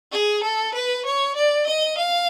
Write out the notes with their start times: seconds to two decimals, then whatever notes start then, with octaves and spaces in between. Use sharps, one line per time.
0.12 G#4
0.44 A4
0.74 B4
1.06 C#5
1.36 D5
1.67 D#5
1.98 F5